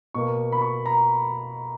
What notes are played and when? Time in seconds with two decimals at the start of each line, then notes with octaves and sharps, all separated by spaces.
0.14 B2 A#3 C#6
0.52 B5
0.61 C#6
0.86 A#5